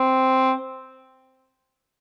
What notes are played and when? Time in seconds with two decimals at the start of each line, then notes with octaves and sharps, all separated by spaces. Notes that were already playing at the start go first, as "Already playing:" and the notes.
Already playing: C4